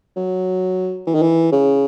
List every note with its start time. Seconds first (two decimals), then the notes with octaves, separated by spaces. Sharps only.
0.16 F#3
1.07 E3
1.15 D#3
1.22 E3
1.52 C#3